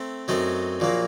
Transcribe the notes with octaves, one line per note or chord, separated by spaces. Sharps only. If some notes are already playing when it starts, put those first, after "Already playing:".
Already playing: A3 C4
F#2 F#3 A3 C4 D#4
A#1 A#2 F#3 A#3